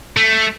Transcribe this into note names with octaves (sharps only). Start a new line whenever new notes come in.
A3